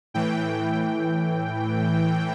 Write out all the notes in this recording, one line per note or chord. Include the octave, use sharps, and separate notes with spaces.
A2 E3 G5